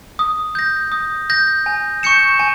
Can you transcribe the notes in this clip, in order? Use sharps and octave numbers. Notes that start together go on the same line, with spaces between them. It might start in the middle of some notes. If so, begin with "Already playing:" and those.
D#6
G6 A#6
D#6
G6 A#6
G#5
C#6 G6 C#7 E7
G#5